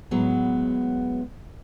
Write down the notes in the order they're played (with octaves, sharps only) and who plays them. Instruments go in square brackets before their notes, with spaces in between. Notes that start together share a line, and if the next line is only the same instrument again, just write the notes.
[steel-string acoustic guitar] A2 F#3 G#3 B3